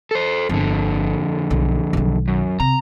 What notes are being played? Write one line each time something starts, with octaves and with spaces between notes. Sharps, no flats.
A4 C5
G1 F2 D3
B1
B1 D#3
F#2
C3 A#5